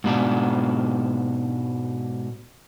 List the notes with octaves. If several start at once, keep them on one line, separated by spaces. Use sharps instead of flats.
G#2 B2 D4